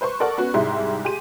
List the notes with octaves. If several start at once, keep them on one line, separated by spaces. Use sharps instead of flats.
B4 C5 C6 C#6
A4 A#4 D5 F#5 C#6
B3 C#4 F#4
C2 G#2 G#3 E4 G4 C6
G4 G#4 C6 D#7